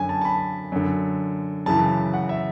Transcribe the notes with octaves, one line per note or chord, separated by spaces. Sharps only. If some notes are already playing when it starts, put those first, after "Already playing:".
Already playing: F#2 D3 G#5
A5
A5
B5
F#2 D3
F#2 C#3 E3 A5
F#5
E5